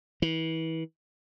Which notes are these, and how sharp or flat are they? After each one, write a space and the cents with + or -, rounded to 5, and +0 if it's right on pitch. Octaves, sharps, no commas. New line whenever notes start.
E3 -30